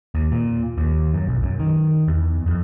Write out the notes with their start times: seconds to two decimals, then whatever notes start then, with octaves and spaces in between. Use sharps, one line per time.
0.15 D#2
0.31 A#2
0.78 D#2
1.14 F#2
1.27 B1
1.43 F#2
1.60 D#3
2.08 E2
2.46 F2